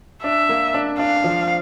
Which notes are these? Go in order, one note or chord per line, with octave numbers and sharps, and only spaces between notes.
D4 E5
A#3
D4
D4 F5
F3